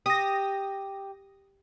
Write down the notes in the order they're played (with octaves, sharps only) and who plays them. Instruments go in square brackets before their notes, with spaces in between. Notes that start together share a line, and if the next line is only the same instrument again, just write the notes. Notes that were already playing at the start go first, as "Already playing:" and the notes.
[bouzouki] G4 [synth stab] D#6 A#6